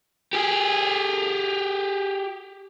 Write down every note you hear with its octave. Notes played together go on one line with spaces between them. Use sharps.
G4 G#4